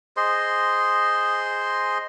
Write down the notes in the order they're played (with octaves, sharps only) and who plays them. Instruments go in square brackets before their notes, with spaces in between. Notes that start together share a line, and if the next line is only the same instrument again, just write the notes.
[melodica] G#4 C5 D#5 C6